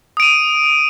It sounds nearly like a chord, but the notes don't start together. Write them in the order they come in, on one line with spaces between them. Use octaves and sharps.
D#6 D7 D#7